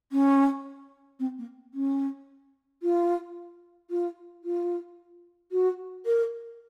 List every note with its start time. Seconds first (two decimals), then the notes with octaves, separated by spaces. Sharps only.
0.12 C#4
1.19 C4
1.38 A#3
1.74 C#4
2.82 F4
3.90 F4
4.44 F4
5.52 F#4
6.06 A#4